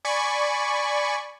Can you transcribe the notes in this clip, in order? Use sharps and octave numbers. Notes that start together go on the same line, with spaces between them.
D5 G#5 B5 C#6